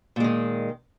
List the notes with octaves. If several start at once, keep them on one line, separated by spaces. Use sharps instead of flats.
A#2 D#3 G#3